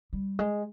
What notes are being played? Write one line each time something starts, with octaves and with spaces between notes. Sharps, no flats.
G3
G#3